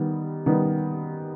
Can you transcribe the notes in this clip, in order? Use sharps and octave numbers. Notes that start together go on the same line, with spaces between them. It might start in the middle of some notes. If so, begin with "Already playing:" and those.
Already playing: D#3 G3 B3
D#3 G3 B3